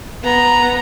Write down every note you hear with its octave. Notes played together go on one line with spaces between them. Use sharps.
B3 A#5